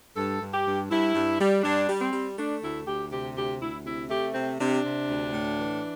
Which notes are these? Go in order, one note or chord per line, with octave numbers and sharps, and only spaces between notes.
G2 A4
G2
G4
G2
G2 E4
G2
G3
G2 D4
G3
C4
G3
A3 D4
D2 E4
D2 G4
C3 G4
D2 G4
D2 E4
C3 E4
A3 G4
C3 C4
C3 D4
C3
D2
A2
E3